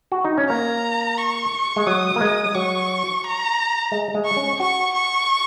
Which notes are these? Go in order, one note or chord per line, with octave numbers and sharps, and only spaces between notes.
F#4
D#4
C#4
A#3 A#5
C#6
G#3
F#3 D#6
A#3
G#3
F#3 C#6
A#5
G#3
G#3
C#6
C#4
F#4 C#6
C#6